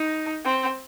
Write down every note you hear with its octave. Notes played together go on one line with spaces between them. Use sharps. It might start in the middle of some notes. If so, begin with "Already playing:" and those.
Already playing: D#4
C4